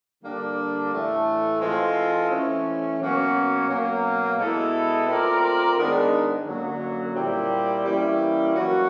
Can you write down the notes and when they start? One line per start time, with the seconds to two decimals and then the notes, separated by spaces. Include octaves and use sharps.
0.22 D3 G3 A#3 D4
0.91 A2 E3 A3
1.60 E3 G#3 C4 F4 A4
2.30 E3 A3 C#4
2.99 B2 F#3 A#3 C#4 F#4
3.68 B2 F#3 A#3
4.38 B2 G#3 B3 E4 A4
5.08 A3 C4 F4 A#4 D5
5.77 G#2 D#3 G#3 B3 D4
6.45 F#2 D3 F#3 A#3
7.15 A#2 G3 C4 E4 G4
7.85 E3 G3 A#3 C#4 E4
8.54 F#3 A#3 C#4 F#4